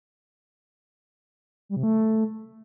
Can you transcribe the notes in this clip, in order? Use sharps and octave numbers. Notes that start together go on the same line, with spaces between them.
G3
C3
A3